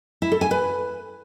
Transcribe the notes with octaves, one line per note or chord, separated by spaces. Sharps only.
E4
A4
G#5
B4